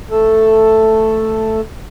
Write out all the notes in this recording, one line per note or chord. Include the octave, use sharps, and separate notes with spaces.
A3 A4